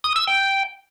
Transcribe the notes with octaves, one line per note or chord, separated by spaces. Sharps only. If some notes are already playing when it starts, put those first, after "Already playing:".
D#6
E6
G5